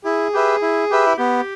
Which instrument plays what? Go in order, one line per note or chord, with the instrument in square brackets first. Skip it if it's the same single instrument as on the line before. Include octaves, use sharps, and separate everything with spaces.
[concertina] E4 [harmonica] G#4
[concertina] G4 B4 E5
E4
G4 B4 E5
[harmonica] E4
[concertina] B3 [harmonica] G4